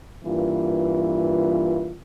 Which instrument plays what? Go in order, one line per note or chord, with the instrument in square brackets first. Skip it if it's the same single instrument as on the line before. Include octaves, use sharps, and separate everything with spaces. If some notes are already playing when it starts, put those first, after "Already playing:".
[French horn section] G2 E3 A#3 F4